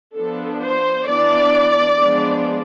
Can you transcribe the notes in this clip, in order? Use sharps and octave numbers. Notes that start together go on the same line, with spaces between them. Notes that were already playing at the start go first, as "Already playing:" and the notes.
F3 B3 D4 A4
C5
E3 B3 D4 D5
F3 G#3 B3 D4